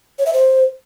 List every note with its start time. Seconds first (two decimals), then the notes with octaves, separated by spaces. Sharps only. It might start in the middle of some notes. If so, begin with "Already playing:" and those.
0.19 C#5
0.26 E5
0.33 C5